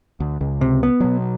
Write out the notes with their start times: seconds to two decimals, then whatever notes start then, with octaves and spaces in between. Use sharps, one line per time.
0.20 D2
0.41 C#2 C#3
0.61 C3
0.83 B3
1.00 B2 F#3